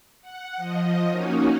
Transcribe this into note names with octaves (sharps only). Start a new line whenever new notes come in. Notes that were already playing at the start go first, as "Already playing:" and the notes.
F#5
F3 D#5
A#3 C#4 D#4 F#4